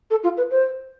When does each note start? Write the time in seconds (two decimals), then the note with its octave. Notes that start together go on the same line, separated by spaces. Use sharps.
0.10 A4
0.23 F4
0.37 B4
0.51 C5